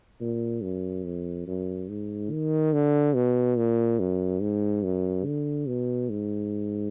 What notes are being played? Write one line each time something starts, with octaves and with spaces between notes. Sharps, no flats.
A#2
F#2
F2
F#2
G#2
D#3
D3
B2
A#2
F#2
G#2
F#2
D3
B2
G#2